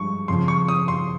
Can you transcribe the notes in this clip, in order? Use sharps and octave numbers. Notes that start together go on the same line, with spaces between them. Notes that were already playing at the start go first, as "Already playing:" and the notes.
Already playing: G2 F3 G#3 C#6
F2 C#3 F3 C6
C#6
D#6
C6